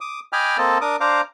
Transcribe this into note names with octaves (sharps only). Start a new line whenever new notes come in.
D6 D#6
D#5 G5 G#5 B5 D6 F6
A#3 C4 A4 D#5 A5
D4 A#4 D6 D#6
D4 C5 F5 A#5 D6